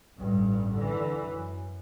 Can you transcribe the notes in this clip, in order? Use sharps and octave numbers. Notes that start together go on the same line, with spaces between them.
A1 G2
D3 E3
F#2